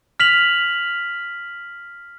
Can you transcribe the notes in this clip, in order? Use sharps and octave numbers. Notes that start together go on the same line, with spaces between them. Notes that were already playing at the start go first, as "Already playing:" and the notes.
F6 B6 F7 F#7